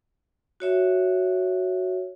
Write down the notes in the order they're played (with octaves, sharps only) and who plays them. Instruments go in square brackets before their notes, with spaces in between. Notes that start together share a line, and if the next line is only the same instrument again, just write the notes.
[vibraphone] F#4 C#5 E5